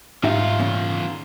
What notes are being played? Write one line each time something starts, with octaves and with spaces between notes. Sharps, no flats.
G#2 D#3 D#4 F4 G4 E5
E2 A#2 C#3